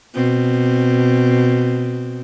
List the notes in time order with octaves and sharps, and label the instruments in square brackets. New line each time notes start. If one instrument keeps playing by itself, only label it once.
[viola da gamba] B2 C4